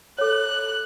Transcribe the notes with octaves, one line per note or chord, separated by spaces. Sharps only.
A4 C#5 F#6